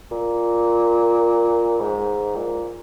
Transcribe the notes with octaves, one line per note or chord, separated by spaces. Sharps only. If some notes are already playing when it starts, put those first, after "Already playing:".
A#2
G#2
A#2